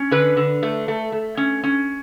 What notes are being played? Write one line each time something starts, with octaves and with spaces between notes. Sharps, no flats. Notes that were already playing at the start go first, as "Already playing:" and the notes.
Already playing: C#4
D3 B4
D3
A3
A3
A3
C#4
C#4